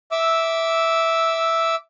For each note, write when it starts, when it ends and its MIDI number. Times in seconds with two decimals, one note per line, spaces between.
0.12 1.75 76
0.12 1.75 86
0.12 1.75 88